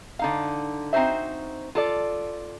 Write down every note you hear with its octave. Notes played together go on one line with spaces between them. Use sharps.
D3 D#4 F5
C4 D#4 F#4 C5 E5
F4 A4 D5